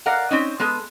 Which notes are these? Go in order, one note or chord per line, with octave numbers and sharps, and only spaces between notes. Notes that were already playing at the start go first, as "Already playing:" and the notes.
A#4 D5 F5 F#5
C4 C#4 D#4
G#3 B3 A4